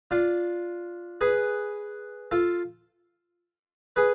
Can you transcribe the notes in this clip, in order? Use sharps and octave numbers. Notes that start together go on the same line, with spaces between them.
D4 F4
G#4 B4
F4 A4
G#4 B4